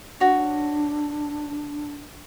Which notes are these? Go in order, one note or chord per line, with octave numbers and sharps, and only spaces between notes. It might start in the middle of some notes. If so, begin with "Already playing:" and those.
D4 F#4 C#5